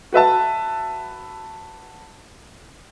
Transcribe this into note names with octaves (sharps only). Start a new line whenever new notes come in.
F#4 B4 E5 A5